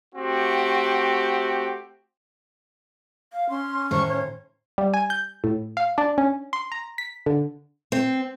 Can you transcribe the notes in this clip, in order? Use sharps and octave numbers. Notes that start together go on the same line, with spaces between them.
A3 C4 F#4 G4
F5
C#4 C6
A2 D#3 C5 C#6
C#5
G3
G#5
G6
A2
F5
D4
C#4
C6
A#5
B6
D3
C4